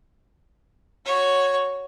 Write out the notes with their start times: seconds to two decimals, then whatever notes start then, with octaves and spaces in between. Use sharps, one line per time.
1.06 F#4 C#5